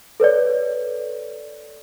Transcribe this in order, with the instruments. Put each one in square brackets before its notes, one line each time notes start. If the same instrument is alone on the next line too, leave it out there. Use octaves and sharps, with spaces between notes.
[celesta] A4 B4 C#5 D5